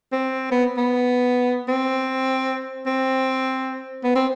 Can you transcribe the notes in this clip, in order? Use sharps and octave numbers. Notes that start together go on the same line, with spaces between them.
C4
B3
B3
C4
C4
B3
C4